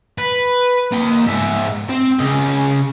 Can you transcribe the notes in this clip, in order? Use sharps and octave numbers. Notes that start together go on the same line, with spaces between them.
B4
A#3 G5
G#2 E5
C4
C#3 D#5